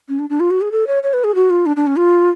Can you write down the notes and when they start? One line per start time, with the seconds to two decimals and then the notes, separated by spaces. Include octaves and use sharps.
0.09 C#4
0.19 D4
0.30 D4
0.40 F4
0.51 F#4
0.61 G#4
0.72 A4
0.87 C#5
1.03 C#5
1.13 B4
1.24 G#4
1.35 F#4
1.50 F4
1.66 D4
1.76 D4
1.87 C#4
1.97 F4